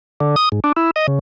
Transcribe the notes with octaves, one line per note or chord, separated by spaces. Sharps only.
D3
D#6
G#2
D4
E4
D#5
C#3